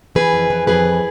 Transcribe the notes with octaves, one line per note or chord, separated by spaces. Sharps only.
E3 G#4 B4
F2
E3
F2 G#4 B4
E3